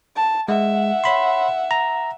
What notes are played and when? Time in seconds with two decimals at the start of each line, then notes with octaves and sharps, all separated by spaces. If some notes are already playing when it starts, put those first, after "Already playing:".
0.16 A5
0.48 G#3 E5 F#5
1.04 C#5 B5 C6
1.71 A#5